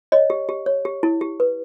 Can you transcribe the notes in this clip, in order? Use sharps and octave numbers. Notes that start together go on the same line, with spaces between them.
C#5 D#5
G4
G4
C#5
G4
E4
G4
B4